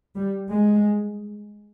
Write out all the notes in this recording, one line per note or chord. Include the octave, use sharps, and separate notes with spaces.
G3
G#3